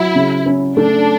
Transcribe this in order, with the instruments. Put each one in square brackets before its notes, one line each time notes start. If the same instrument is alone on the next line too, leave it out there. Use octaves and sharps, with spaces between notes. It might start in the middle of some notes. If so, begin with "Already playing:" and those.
Already playing: [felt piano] F#3 [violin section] E4
[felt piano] C#3
C#4
[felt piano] A3 [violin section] D4